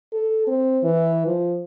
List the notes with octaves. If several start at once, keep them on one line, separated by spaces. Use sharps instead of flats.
A4
C4
E3
F3